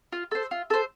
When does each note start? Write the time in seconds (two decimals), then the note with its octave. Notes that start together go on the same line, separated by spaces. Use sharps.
0.12 F4
0.31 A4 C5
0.51 F4
0.70 A4 C5